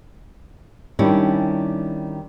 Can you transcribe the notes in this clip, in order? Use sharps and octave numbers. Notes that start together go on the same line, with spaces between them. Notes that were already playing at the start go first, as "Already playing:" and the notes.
D#3 G3 C#4 D4 E4